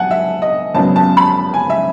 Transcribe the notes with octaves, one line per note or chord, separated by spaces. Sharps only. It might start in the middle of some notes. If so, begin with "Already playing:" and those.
Already playing: B1 F#3 B3 F#5 G#5 A5
E5
D#5
G#1 F#2 C#3 F#3 B3 A5
A5
B5
G#5
E5